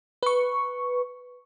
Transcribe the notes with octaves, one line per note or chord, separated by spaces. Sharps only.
B4 C#6